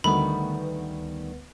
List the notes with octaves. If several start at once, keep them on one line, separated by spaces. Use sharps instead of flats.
D2 D#3 G3 A3 B3 B5